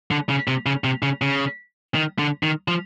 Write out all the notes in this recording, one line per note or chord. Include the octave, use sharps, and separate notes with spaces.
D3
C#3
C3
C#3
C3
C#3
C#3
D#3
D3
D#3
F3